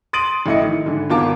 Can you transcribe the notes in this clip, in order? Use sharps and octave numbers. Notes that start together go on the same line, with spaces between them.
C6 D#6 A6 D7 D#7 F#7
A1 A3 E4 D#5 C#7
D#3
G#2 D3 E3
G#1 B3 F4 A#4 A5 D6